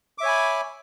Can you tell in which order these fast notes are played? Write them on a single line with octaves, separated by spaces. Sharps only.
D6 E5 C#5 G#5 B5